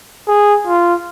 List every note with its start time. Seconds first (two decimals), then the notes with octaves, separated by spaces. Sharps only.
0.28 G#4
0.67 F4